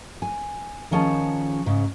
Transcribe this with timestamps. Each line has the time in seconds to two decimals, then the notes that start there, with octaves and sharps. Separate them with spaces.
0.22 G#5
0.91 D#3 F3 C#4 G#4 G#5 A5
1.66 G#2 C#3